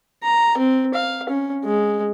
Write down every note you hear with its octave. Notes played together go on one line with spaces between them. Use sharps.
A#5
C4
F5
C#4
G#3